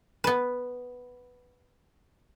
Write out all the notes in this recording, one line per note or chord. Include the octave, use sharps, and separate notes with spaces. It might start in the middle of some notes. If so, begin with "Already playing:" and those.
B3 B4